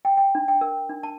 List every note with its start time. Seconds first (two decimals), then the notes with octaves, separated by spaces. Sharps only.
0.05 G5
0.17 G5
0.35 D4
0.48 G5
0.61 A#4
0.89 D4
1.03 A5